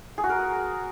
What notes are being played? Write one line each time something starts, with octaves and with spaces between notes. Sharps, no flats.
G#4
F#4
A#4